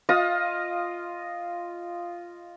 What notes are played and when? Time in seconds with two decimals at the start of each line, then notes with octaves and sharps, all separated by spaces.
0.09 F4 D#5 F5 D#6